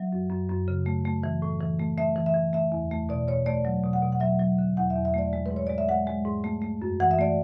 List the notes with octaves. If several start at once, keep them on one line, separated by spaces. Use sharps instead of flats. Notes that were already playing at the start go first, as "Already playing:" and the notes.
Already playing: F#3 E5
F#2
F#2
F#2
C#3
A3
A3
E3
A2
E3
A3
A3 E5
E3
E5
E3
A3 E5
E2
A3
B2 D5
B2 C#5
A3 D5
F#3
B2
F#5
B2
F#5
F#3 E5
F#3
D3
E2 F#5
E5
E2
E5
A3 D5
G#3
B4
G#2
C#5
G#3 D5
E5
G#3 F#5
G#3
G#2
A3
A3
F#2
E3 F#5
E5
A3 D5